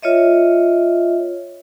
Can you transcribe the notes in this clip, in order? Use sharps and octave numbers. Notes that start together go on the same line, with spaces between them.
F4 C#5 D#5 E5